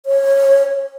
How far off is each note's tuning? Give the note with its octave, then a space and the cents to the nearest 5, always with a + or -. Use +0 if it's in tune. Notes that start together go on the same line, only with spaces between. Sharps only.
C#5 -20